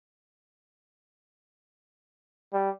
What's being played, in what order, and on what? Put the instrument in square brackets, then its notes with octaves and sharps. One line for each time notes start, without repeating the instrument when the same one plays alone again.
[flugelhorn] G3